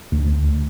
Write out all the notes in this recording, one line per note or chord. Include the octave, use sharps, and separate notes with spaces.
D2